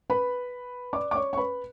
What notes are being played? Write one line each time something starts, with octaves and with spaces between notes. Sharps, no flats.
B4 B5
D5 D6
D6
C#5 C#6
C#6
B4 B5